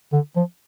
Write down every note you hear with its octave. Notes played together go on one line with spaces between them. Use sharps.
D3
F3